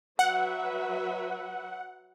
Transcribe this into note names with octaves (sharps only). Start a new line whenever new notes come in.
F#3 B4 E5 F#5